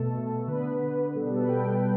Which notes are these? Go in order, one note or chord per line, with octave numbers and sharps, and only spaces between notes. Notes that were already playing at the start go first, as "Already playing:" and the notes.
Already playing: B2 A3 A4
B2 A3
D3 B3 B4
D3 B3
B2 G3 B3 A4
A4
B4
B2 G3 B3 G5